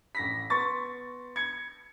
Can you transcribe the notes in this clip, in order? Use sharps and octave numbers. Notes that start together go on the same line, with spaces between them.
A1 A#6 B6
B3 C6 C#6 A6
G#6 C#7